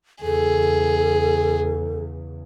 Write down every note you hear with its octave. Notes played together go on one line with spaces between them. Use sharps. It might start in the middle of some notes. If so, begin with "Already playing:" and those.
E2 C#3 G#4 A4